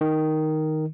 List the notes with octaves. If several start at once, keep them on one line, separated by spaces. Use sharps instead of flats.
D#3